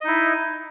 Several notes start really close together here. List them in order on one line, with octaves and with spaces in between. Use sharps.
D#5 D#4 E4